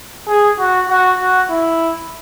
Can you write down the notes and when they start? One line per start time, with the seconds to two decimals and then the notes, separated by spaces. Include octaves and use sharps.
0.28 G#4
0.59 F#4
0.88 F#4
1.19 F#4
1.50 E4